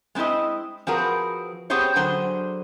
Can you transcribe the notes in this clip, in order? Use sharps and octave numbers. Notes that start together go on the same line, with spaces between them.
G#3 C4 C#4 E4 D#5
F3 C4 F#4 G#4 A#4 B4
B3 C4 G4 G#4 C5 C#5
D3 F#3 G#4 C5